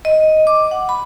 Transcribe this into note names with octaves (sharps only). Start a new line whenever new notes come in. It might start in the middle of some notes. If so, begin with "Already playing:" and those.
D#5
D6
F#5
B5